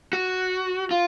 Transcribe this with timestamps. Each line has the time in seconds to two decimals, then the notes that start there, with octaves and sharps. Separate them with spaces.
0.13 F#4
0.91 F4